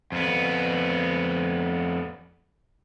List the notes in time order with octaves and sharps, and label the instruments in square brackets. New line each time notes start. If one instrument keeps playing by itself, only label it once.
[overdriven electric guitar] F2 B3